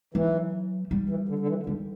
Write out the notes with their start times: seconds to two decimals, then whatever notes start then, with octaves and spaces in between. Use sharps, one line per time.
0.14 E3 F#3
0.91 G3
1.09 E3
1.29 D3
1.39 D3
1.48 E3
1.66 D3 G3